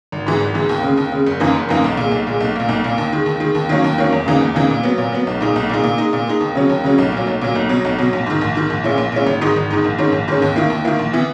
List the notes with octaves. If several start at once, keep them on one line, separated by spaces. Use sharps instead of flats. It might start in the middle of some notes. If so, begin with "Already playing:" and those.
G#1
G#2 E3 G#3
G#1
G#2 E3 G#3
D#2
C#3 G#3
D#2
C#3 G#3
F#1
F#2 E3 A#3 D#4
F#1
F#2 E3 A#3 D#4
B1
A#2 G#3
B1
A#2 G#3
B1
A#2 A#3
B1
A#2 A#3
D#2
D#3 G#3
D#2
D#3 G#3
D#2
D#3 F#3 A#3 C#4
D#2
D#3 F#3 A#3 C#4
E2
C#3 E3 A#3 D#4
E2
C#3 E3 A#3 D#4
A#2
F#3 B3
A#2
F#3 B3
B1
A#2 G#3 D#4
B1
A#2 G#3 D#4
A#2
G#3 D#4
A#2
G#3 D#4
D#2
C#3 F#3 C#4
D#2
C#3 F#3 C#4
B1
A#2 F#3
B1
A#2 F#3
B1
B2 F#3
B1
B2 F#3
A#1
G#2 D#3
A#1
G#2 D#3
A#1
A#2 G#3 C#4 E4
A#1
A#2 G#3 C#4 E4
G#1
G#2 D#3 G#3 D#4
G#1
G#2 D#3 G#3 D#4
A#1
G#2 D#3 G#3 C#4
A#1
G#2 D#3 G#3 C#4
D#2
D#3 A#3 E4
D#2
D#3 A#3 E4
A#1
E3 B3 E4